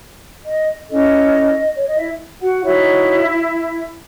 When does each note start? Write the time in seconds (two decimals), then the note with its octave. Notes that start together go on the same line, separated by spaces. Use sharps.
0.45 D#5
0.89 C#4 E4 A4 D#5
1.75 C#5
1.86 D#5
1.97 E4 E5
2.41 F#4 F#5
2.62 D#4 E4 F#4 C#5 E5